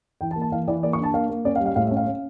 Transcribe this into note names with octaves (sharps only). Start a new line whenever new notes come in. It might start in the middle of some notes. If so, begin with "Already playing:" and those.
E3 G5
A5
A#3
A5
E3 F5
E3 D5
A#3 D5
C#6
D4
A5
A#3 F5
A#3
C#4 D5
F5
G3
F5
A2 F5
E5
C#4
F5
C#4